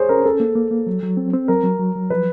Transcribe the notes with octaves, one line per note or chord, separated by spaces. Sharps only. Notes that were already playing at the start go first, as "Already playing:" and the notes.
Already playing: G#4 C5 C#5
C#4 A#4
C#4 A4
A#3
A#3
A#3
F#3
F#3
C4
C4
F#3 A#4
F#3
F#3
F#3
F3 B4